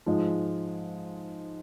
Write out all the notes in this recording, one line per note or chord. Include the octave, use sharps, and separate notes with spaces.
G#2 F3 G#3